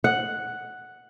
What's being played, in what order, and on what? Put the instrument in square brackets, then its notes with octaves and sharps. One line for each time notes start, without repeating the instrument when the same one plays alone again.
[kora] F#5